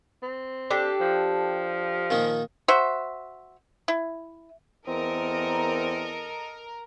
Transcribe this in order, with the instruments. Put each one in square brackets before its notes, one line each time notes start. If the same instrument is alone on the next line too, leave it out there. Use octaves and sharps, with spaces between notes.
[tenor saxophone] C4
[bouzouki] D4 G4 A4
[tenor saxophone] F3
[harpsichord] A#2 D#3 D#4
[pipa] F#4 C5 E5
E4
[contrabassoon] E2 [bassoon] C4 [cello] A4 D#5 [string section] A#4